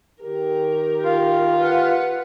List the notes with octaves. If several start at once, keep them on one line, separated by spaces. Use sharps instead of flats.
D#3 G4 A#4
F4
B4 F#5